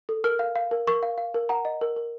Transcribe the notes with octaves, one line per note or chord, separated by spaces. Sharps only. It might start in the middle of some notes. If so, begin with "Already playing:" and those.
A4
A#4 F6
F5
F5
A#4
A#4 C#6
F5
F5
A#4
F#5 A#5
D#5
A#4
A#4